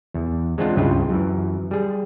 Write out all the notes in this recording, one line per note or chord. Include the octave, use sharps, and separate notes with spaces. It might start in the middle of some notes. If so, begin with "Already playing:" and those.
E2
G#3 C4 D4 F4 F#5
C#2 G2 C#3 E4 F4 G5
F#2 E3
G3 G#4